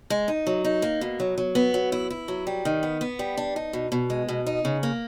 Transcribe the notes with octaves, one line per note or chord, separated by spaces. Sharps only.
G#3
D#4
F#3
D#4
A#3
B2
F#3
F#3
B3
F#3
E4
E4
F#3
G3
D#3
B3
B3
G3
D4
D#4
B2
B2
G#3
B2
D#4
C#3
A#3